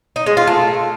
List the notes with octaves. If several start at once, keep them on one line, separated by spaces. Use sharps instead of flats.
D#4
G#3
F4
A3